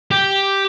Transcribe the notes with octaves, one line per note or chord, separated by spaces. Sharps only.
G4